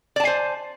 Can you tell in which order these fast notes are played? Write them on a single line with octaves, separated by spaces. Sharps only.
D5 A5 G#5 C5